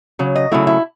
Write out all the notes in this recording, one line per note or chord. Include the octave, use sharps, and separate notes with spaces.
C#3 F#3
D#5
C#3 F#3 A3 E4
E4